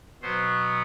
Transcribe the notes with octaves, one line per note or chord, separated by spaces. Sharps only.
B2 F#3 B3 C5